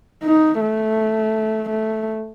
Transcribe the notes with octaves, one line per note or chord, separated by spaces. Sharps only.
D#4
A3
A3